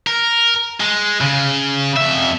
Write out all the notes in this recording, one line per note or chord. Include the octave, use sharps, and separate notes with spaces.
A#4
G#3
C#3
F2 E5